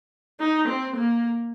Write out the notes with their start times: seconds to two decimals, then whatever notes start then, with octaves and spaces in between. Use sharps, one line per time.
0.40 D#4
0.68 C4
0.96 A#3